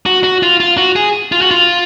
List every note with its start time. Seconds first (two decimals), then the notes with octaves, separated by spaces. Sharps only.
0.06 F#4
0.24 F#4
0.43 F4
0.60 F4
0.78 F#4
0.96 G#4
1.32 F4
1.42 F#4
1.51 F4